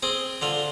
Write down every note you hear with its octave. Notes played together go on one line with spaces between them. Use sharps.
C4 G#4
D3 F4